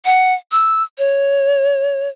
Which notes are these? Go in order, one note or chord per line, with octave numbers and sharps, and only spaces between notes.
F#5
E6
C#5